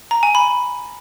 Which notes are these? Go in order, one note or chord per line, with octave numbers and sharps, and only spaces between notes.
A#5
G#5
B5